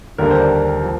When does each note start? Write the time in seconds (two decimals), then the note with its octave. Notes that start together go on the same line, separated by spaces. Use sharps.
0.18 D#2 D3 G3 A#3 A#4
0.30 C5
0.40 D5
0.83 F3